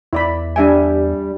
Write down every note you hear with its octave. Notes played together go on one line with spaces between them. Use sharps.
E2 E4 D5 B5
G3 D4 E5 G#5